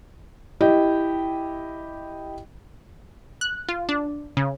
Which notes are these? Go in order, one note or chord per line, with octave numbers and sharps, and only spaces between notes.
E4 G4 D#5 G5
F#6
F4
D4
C#3